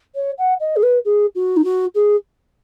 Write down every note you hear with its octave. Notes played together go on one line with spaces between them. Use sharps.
C#5
F#5
D#5
G#4
B4
G#4
F#4
D#4
F#4
G#4